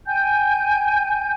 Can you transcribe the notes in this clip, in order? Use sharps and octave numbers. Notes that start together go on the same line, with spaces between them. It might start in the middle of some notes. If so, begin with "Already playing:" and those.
G5 G#5 G6